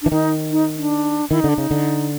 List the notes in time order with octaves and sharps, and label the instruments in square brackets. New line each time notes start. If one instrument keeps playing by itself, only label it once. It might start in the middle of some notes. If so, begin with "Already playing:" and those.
[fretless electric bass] E3 [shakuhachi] D4
[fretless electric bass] D#3 [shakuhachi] D#4
[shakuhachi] D#4
D4
[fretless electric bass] D#3 [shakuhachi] E4
[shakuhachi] D#4
[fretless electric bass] D3 [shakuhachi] D4
[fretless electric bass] C#3 [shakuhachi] D#4
[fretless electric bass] D3